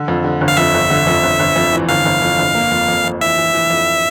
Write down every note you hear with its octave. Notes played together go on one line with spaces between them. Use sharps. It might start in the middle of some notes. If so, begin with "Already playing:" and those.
Already playing: D3
F2
D3
G1
F5
F2 E5
G1
D3
F2
G1
G1
F2
E3
G1 F5
G1
F2
G1
A#3
F2
F2
F2
E3 E5
E3
E3
F2